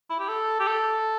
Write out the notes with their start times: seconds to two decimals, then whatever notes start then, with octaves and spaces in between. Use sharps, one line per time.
0.10 E4
0.19 G4
0.29 A4
0.60 G4
0.67 A4